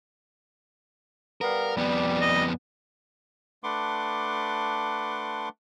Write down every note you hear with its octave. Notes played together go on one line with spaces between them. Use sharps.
G3 B3 A#4 F5
F2 G3 B3
D#5
A3 D4 B4 F#5 C6 D6